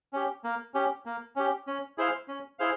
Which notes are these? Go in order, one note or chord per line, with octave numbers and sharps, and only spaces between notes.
C#4 G4
A#3
C#4 G4
A#3
C#4 G4
C#4
E4 G#4 C5 F5
C#4
E4 G#4 C5 F5